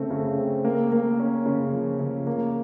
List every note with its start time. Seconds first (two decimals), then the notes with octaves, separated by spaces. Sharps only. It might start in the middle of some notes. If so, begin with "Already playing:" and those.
Already playing: C#3 A3 C4
0.11 C#3
0.37 C4
0.65 A#3
0.92 A#3
1.19 C#4
1.46 C#3
1.72 F3
1.99 C#3
2.27 A#3